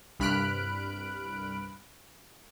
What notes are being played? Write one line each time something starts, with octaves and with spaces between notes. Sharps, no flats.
C2 G2 B5 F6 F#6 D7